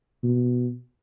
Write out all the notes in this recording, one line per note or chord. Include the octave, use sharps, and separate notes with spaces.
B2